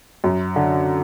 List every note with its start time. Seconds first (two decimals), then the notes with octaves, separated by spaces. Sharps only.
0.24 F#2
0.56 D3